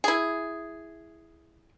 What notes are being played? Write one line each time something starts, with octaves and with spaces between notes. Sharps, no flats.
E4 G#4